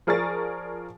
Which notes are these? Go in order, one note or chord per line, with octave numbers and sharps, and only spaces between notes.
F3 G#4 A#4 D5 C#6 A6